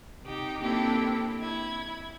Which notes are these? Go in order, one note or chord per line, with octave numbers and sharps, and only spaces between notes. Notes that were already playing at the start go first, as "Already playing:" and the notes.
C3 D#4 G4
A#3 C4 D4 E4 G4 A4
E4 G#6